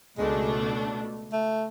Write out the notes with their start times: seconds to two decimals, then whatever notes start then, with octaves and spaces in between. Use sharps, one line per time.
0.17 C#2 B2 G#3 A3 D4
1.33 A3